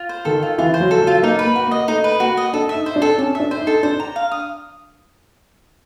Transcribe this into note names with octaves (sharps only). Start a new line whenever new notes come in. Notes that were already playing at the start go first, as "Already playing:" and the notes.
Already playing: F4
C5
D#3 A4
F4
E3 F4
C5
F#3
A4
F#3
F4
A#3 D#4
B4
A#3
F#4
A#3 D#5
A3 D#4
B4
A#3 F#4
D#5
D4 A4
E5
D#4
C5
D4
A4
C#4 A4
D4 E5
C5
D#4
A4
D4 C5
A#5
F5
D#6